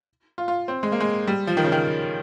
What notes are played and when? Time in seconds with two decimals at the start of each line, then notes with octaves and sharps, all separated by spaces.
0.38 F4
0.48 F4
0.68 C4
0.83 G#3
0.92 A#3
1.00 G#3
1.27 G3
1.47 F3
1.57 D#3
1.64 C#3
1.72 D#3